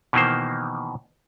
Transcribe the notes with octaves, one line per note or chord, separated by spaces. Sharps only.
B2 D#3 E3 A#3 C5